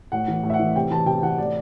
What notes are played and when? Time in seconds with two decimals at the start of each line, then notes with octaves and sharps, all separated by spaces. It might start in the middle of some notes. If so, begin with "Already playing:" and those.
0.12 A2 F#5
0.28 E3
0.43 A2
0.50 E5
0.54 F#5
0.59 E3
0.76 C3 G5
0.90 E3 A5
1.06 C3 G5
1.23 E3 F#5
1.38 A2 D5